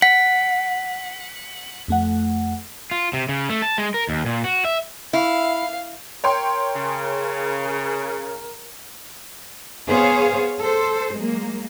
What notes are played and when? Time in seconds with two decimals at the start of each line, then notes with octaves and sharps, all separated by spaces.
0.02 F#5 B6
1.88 F2 A3 F#5
2.91 F4
3.13 C3
3.29 C#3
3.50 A3
3.62 A5
3.78 G#3
3.94 A#4
4.09 D#2
4.26 A#2
4.44 F#4
4.65 E5
5.13 E4 F5
6.24 A#4 C#5 G5 C6
6.75 C#3
9.88 B3 G#4 C5 C#5 F5
10.62 A4 C5
11.15 F#3 G#3 A#3